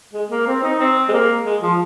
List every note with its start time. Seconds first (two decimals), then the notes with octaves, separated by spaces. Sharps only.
0.14 G#3
0.31 A#3
0.47 C4
0.63 D#4
0.80 C4
1.09 G#3
1.13 A#3
1.45 G#3
1.62 F3